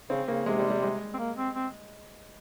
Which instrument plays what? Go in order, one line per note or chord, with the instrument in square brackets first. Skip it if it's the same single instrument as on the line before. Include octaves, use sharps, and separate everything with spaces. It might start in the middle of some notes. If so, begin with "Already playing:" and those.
[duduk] C#3 [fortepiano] C4
[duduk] C#3 [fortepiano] A#3
[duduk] C3 [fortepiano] G#3
[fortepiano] G3
G3
G#3
[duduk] C4
A#3
C4
C4